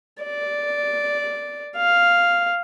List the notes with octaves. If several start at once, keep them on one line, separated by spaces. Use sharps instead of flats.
D5
F5